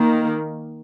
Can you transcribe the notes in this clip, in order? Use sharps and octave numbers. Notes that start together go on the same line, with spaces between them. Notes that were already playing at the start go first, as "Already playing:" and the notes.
Already playing: D#3 A#3